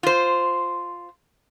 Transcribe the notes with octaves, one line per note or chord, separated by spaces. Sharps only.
F4 C5